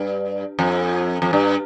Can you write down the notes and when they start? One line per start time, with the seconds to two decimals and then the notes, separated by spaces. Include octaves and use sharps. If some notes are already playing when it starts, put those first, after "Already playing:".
Already playing: G2
0.59 F2
1.22 F2
1.33 G2